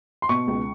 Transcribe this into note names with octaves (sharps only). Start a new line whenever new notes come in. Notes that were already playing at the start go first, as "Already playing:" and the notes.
C6
B2 C#6
C#2